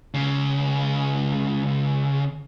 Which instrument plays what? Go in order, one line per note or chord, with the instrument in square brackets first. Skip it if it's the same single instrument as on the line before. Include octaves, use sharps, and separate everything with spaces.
[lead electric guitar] C#2 C#3